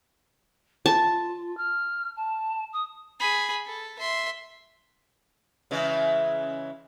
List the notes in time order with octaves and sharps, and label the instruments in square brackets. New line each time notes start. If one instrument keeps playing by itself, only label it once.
[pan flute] F4 [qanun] A5
[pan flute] F6
A5
D#6
[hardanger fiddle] G#4 B5
A4
E5 C6
[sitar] C#3 E3 G#3